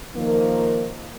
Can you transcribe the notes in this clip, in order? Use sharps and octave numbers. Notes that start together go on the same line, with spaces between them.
D#3 F3 A#3